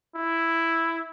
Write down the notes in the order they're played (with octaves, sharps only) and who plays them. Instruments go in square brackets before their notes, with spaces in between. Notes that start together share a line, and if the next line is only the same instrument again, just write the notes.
[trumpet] E4